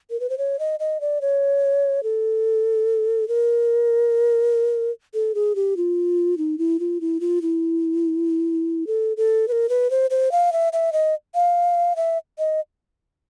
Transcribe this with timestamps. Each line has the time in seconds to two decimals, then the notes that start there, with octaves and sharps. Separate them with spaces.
0.10 A#4
0.20 B4
0.30 C5
0.38 C#5
0.59 D#5
0.80 D#5
1.01 D5
1.21 C#5
2.03 A4
3.28 A#4
5.14 A4
5.35 G#4
5.55 G4
5.77 F4
6.38 D#4
6.58 E4
6.80 F4
7.01 E4
7.20 F4
7.42 E4
8.87 A4
9.17 A4
9.48 B4
9.52 A#4
9.69 B4
9.90 C5
10.10 C5
10.32 F5
10.52 E5
10.73 E5
10.93 D#5
11.35 F5
11.96 E5
12.39 D#5